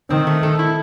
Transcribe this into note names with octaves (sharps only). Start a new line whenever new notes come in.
D#3 C4
A3
A4
E4